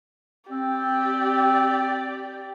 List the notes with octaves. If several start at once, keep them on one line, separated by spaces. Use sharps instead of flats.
C4 G4 D5